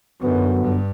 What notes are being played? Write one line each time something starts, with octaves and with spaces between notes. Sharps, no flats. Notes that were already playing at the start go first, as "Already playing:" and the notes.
F#2 D3 F#3 B3
G2